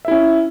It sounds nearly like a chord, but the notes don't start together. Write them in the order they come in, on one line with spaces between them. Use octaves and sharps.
E5 E4 C#4